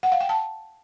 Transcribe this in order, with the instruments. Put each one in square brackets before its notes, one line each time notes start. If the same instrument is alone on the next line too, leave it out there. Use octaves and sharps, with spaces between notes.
[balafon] F#5
F5
G5
A5